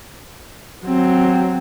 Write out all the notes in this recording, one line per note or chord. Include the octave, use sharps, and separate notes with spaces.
F#3 C4